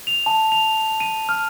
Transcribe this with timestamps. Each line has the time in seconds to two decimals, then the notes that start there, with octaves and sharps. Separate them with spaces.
0.07 F7
0.26 A5
0.52 F7
1.00 D#7
1.29 F6